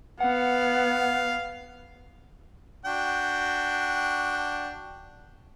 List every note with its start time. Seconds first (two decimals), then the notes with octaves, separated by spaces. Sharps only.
0.20 B3 F5 F#5
2.85 D4 F#4 G5